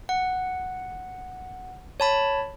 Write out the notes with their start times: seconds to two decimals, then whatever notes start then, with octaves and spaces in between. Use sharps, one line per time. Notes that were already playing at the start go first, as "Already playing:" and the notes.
0.09 F#5
2.00 C#5 A5 B5